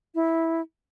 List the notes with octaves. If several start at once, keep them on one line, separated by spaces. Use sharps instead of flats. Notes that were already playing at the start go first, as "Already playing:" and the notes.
E4